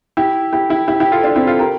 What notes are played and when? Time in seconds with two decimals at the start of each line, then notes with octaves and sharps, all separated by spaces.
0.17 E4 G4
0.53 E4 G4
0.70 E4 G4
0.88 E4 G4
1.00 E4 G4
1.12 F4 A4
1.24 D4 F4
1.36 C4 E4
1.47 F4 A4
1.59 G4 A#4